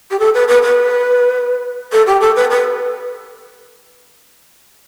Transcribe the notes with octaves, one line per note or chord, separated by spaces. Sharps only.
G4
A4
B4
B4
B4
A4
G4
A4
B4
B4